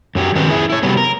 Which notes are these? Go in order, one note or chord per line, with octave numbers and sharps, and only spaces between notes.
F#2 F#3 G4
D#3 F#3 G#3 C4 C#4 B4
E4 G#4 E5
E4 C#5
C3 F#3 G3 B3
A#4